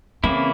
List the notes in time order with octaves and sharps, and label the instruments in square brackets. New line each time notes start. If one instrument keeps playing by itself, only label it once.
[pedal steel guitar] C#3 E3 A#3 E4 [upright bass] C4